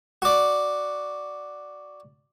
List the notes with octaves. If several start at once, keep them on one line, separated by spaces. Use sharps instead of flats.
F#4 D5